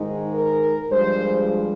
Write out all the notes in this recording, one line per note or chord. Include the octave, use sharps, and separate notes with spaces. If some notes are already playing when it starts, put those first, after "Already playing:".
Already playing: G#2 D#3 G#3
A#4
G2 F3 G#3 C5